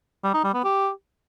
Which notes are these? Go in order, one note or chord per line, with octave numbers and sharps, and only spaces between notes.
G3
D#4
G3
B3
G4